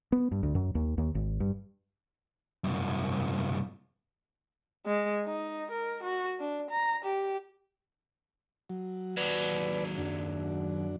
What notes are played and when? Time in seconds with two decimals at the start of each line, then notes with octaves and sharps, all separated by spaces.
0.12 B3
0.32 G2
0.43 D2
0.55 F#2
0.75 D#2
0.98 D#2
1.15 G#1
1.40 G2
2.64 C2 F#2
4.86 G#3
5.25 D#4
5.71 A#4
6.03 F#4
6.40 D4
6.71 A#5
7.05 G4
8.70 F#3
9.17 D#2 F#3 B4 D5
9.98 F#2 D4